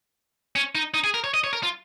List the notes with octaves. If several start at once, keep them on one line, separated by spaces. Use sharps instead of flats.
C#4
D#4
D#4
G#4
A#4
C#5
D#5
C#5
A#4
F4